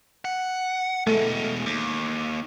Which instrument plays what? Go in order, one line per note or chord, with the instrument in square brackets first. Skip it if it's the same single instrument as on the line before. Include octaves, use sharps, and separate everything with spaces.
[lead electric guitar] F#5
[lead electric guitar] B2 G#3 [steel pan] A3
[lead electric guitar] D#2